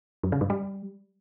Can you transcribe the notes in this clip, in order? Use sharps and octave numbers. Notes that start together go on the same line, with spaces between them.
F#2
C#3
G2
G3